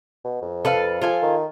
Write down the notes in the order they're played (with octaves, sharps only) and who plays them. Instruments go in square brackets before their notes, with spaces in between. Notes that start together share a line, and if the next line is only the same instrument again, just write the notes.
[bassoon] B2
F2
[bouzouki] A4 B4 F5
[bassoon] F3 [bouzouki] F4 A4 G#5
[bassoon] D#3